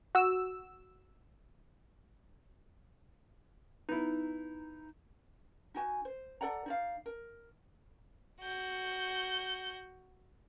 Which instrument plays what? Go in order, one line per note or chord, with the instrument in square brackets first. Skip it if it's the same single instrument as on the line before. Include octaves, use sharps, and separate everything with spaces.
[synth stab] F#4 E6
[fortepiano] B3 E4 [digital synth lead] D#4
[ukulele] D#4 F#4 G#5
C5
A4 D5 F#5 A#5
D#4 D5 F5
A#4
[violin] F#4 G6